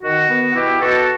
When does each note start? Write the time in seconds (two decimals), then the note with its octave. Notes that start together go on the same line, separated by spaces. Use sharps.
0.02 D#3 F#4
0.29 B3
0.55 B2 E4 G4
0.80 B2 F#4 A4